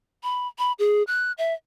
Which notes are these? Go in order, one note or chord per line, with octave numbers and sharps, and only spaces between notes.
B5
B5
G#4
F#6
E5